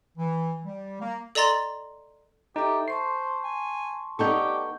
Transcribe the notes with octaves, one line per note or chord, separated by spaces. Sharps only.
E3
G3
A#3
A4 D5 D#5 A#5 C6 A6
D#4 G4 A4 E5
C5 A5 C6 C#6 C7
G#5
B3 D#4 G4 A4 D5 C#6 G6